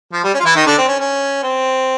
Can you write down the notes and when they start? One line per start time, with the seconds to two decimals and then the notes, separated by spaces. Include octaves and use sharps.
0.13 F3
0.24 G3
0.34 C#4
0.40 F4
0.45 E3 E4
0.56 D#3 D#4
0.66 D3 D4
0.78 C4
0.88 C#4
1.00 C#4
1.43 C4